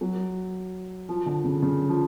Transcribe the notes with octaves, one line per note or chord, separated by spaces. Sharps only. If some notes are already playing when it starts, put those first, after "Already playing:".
F#3
F3
D3
C#3
C#3
F3